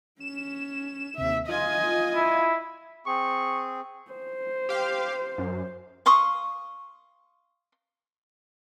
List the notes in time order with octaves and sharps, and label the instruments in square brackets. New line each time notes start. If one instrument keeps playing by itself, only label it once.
[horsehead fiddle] C#4 [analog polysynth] E7
[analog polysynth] D#2 C3 [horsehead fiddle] E5
[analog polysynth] F4 [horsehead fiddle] D#5 G#5
[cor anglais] E4
[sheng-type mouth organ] C4 G#4 [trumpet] C#6
[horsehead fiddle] C5
[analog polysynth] G4 F5
F#2
[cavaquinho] F5 C6 C#6 D#6